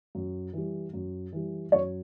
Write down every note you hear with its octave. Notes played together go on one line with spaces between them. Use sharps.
F#2
E3 G3
F#2
E3 G3
F#2 C#5